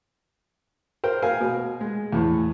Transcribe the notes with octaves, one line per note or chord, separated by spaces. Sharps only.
A#4 C5 G5
A#4 F5 G#5
B2
G#3
E2 A2